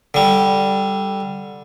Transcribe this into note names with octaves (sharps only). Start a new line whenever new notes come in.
D3 G3